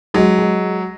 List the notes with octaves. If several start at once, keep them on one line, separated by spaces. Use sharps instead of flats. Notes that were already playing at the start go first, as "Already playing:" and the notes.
F#3 G#3
G#3